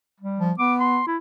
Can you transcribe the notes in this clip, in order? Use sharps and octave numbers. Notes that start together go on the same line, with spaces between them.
G3
F3
B3 D6
C6
E4